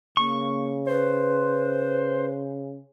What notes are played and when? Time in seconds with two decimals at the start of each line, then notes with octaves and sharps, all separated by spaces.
0.17 C#3 A#3 C#6
0.87 B4 C5